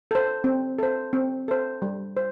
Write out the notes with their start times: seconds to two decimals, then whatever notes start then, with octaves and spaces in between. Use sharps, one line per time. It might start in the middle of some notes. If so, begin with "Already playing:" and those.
0.11 A4 C5
0.44 C4
0.79 A4 C5
1.13 C4
1.48 A4 C5
1.82 G3
2.17 C5